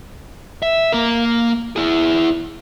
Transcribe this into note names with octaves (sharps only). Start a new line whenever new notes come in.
E5
A#3 A#4
E4 G#4